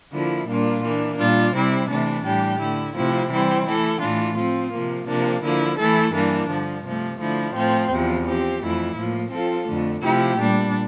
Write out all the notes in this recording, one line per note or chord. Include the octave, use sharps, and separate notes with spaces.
D3 F3 A#3 E4
A#2 G3 A#3 D4 F4
E3 A#3 D4
A#2 G3 D4 F4
C3 G3 C4 E4
C3 E3 A3 D4
A2 E3 G3 D4 G4
D3 A3 E4
C3 F3 A3 C4 E4
E3 G3 C4 E4
E3 A3 E4 A4
A2 E3 A3 D4 F4
F3 C4 F4
C3 F3 A#3
C3 F3 A#3 D4
D3 F3 A#3 E4
E3 A3 E4 A4
G2 E3 A#3 D4
G2 D3 F3
C3 F3 A3
D3 F3 A3 E4
A2 F3 A3 C4
E2 C3 F3
F3 C4 G4
F2 E3 A3 E4
A2 F3 A#3
F3 C4 F4 A4
F2 D3 A3
C3 F3 A3 E4 G4
A#2 G3 D4